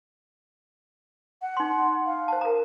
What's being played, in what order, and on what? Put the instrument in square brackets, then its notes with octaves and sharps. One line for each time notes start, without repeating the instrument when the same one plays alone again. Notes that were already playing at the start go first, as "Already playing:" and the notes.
[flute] F#5
[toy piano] D#4 C6
[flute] F5
[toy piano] C5 A5
A#4 A#5